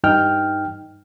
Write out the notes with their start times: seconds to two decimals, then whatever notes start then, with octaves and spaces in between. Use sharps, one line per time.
0.04 G2 D#4 G5 F6